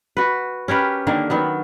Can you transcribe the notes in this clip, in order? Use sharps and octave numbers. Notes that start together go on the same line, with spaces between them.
F#4 B4
C#4 G4 A#4 B4
D3 D#3 A#3
D#3 F#3 B3